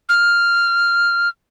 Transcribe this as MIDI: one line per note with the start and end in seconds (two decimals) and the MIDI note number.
0.09 1.29 89